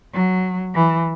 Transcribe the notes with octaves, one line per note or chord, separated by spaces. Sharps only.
F#3
E3